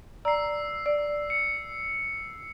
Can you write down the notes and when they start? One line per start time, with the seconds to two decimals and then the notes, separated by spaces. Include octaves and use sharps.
0.25 D5 A#5 E6 C7
0.86 D5
1.30 C#7